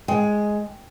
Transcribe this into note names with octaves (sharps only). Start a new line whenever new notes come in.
G#3 G5